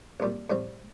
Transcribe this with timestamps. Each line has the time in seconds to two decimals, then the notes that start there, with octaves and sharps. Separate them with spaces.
0.20 C2 A#2 G3
0.50 A2 G3 C4